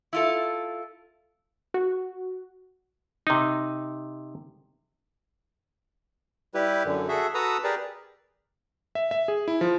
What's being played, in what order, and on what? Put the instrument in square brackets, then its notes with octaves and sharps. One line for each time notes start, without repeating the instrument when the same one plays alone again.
[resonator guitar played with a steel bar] E4 F4 A4
[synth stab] F#4
[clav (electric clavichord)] C3 D#4
[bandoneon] G3 E4 G4 B4
F#2 D3
F#4 G#4 A4 E5
F#4 A4 B4 A#5 D#6 E6
G4 G#4 A#4 B4 D5
[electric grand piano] E5
E5
G#4
E4
F3